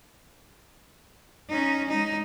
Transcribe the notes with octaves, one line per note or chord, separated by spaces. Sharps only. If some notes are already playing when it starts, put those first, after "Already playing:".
C#4 D#4
G#3 D#4